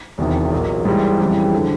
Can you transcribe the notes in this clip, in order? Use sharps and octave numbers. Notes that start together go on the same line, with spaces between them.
E1 E2 C3 D#3
B1 A#2 F#3 A#3
G#2 E3 G3
F2 C#3 E3 G3
D3 F3